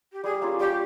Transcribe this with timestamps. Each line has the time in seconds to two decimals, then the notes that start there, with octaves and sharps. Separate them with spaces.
0.12 G4
0.23 G3 G#4
0.41 A#3 C#4 F4 G#4
0.59 G3 G4